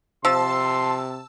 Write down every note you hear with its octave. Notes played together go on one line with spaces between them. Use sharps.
C3 F3 A5 C6 E6